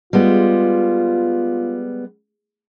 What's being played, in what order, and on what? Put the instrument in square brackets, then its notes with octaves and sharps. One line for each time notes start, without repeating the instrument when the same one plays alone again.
[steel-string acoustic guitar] G3 G#3 B3 [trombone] F4